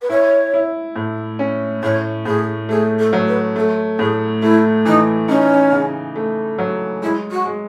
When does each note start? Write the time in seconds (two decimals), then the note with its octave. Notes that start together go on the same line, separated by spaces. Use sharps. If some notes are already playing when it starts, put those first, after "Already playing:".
0.01 B4
0.10 E4 C#5
0.53 E4
0.96 A2
1.39 C#4
1.83 A2 C#5
2.25 A2 G#4
2.69 A3 G#4
2.99 A4
3.13 F#3
3.27 B4
3.56 A3 A4
3.99 A2 G#4
4.42 A3 E4
4.85 E3 D#4
5.28 C#4 D#4
5.72 C#3
6.16 A3
6.59 F#3
7.02 G#3 E4
7.30 F#4
7.46 G#3